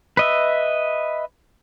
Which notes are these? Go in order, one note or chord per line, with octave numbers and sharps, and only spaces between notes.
B4 D#5 E5